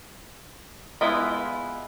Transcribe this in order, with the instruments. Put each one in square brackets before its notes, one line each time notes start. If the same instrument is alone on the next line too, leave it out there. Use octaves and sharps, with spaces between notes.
[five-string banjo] G#3 B3 E4 F4